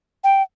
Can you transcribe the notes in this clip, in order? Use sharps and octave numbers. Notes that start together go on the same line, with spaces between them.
G5